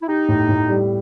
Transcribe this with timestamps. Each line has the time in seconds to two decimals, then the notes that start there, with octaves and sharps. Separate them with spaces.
0.02 E4
0.08 D#4 G4
0.29 A2
0.49 A2
0.69 G3